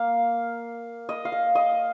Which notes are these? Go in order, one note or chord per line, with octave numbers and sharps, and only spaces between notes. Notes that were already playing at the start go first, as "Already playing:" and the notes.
Already playing: A#3 F5
D#5
F5
D#5
D#5